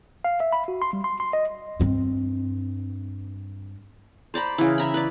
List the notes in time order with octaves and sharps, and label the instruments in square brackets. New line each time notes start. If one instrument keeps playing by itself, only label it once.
[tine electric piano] F5
E5
B5
F#4
C6
G3
C6
C6
D#5
[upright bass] G2 C4
[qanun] C5 D5 A#5 B5
C#3 E3
E5 A#5 B5
B4 D5